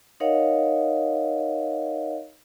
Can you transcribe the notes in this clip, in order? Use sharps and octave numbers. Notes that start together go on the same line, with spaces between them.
D#4 A#4 C#5 D#5 F5 F#5